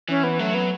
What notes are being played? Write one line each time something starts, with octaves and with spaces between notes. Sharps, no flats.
E3 C#4
B3
F#3 A3
B3